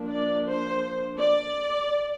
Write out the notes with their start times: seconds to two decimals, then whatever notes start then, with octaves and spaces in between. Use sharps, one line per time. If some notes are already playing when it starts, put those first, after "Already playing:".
Already playing: F3 A#3 D4
0.11 D5
0.47 C5
1.19 D5